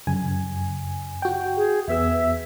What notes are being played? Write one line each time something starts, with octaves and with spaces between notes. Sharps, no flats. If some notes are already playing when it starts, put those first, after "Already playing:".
F#2 C#3 G#5
F#4 G5
G#4
E2 B3 E5 E6